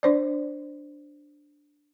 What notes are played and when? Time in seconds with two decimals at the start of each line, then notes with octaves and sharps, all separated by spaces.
0.03 D4 C5 D5